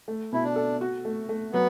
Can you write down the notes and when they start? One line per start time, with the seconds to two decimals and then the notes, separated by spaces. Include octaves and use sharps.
0.08 A3
0.32 B2 E4
0.44 D4
0.56 A4
0.81 F#4
1.05 A3
1.29 A3
1.53 F#3 B3